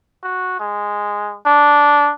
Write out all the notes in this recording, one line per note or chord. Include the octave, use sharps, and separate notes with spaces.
F#4
G#3
D4